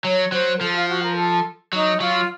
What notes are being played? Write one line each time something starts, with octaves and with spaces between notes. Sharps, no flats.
F#3 C#5
F#3 C5
A#4
F3 A4
F4
F#4
A#4
A4
F#3 D#4
F#3 F4